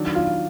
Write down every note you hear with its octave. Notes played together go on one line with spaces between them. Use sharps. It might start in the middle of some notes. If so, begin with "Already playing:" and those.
Already playing: D#3 F#3 D4
F4